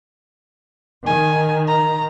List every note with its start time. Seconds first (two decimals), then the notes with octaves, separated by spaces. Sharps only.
1.07 D#3 G#5
1.68 A#5